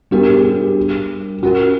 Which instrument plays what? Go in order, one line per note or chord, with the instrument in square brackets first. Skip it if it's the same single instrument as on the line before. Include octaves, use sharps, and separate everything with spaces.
[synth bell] G3 B3 D4 F#4 A#4 [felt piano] G4
[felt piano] G#4
G4
[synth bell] C#4 F4 A#4 [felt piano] F#4